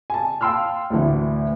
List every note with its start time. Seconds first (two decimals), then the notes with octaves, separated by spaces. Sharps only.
0.10 G#5 A5
0.41 F5 G5 A5 C6 E6 F6
0.90 D2 A2 D3 E3